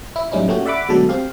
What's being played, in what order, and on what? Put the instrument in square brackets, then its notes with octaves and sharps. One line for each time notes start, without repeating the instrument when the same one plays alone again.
[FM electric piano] E4
F#2 A2 G3 C#4 D#4 E4
A#2 A3 C#4 F#4 G4
D5 E5 F#5 B5 D6
B2 D3 F#3 G#3 A3 A4
C4 G4 F5